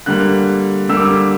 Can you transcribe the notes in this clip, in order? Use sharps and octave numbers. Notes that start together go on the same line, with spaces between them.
D3 G3 A#3 F#6
D3 G3 A#3 E6
D6
E6